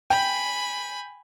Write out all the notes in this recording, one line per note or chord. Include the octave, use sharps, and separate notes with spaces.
G5 G#5 B5